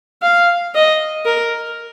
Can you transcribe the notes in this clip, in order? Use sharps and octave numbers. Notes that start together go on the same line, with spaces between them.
F5
D#5
A#4